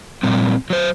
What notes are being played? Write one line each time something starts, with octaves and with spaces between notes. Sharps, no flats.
A#2 G3 C4
F#3 C5